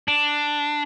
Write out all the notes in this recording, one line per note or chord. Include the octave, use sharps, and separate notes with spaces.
D4